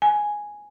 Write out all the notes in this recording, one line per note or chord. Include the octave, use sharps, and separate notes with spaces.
G#5